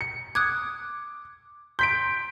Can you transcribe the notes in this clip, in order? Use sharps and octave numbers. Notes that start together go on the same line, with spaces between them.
C#7
D6 D#6 F#6 G#6
C6 G6 B6 D7